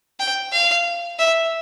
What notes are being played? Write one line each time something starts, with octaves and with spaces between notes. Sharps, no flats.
G5
F5
E5